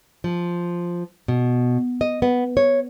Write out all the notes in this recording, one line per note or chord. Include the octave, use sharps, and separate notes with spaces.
F3
B2
D#5
B3
C#5